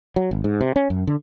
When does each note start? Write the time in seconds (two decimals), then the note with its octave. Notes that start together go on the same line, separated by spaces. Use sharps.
0.16 F#3
0.31 G#1
0.44 G#2
0.61 C3
0.76 C#4
0.90 F#2
1.07 D3